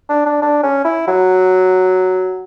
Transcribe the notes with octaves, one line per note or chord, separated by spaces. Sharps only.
D4
D4
D4
C#4
E4
F#3